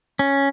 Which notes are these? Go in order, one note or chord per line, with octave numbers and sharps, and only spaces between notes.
C#4